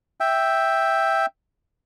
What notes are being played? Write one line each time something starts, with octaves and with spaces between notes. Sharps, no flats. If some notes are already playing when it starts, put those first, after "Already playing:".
E5 G5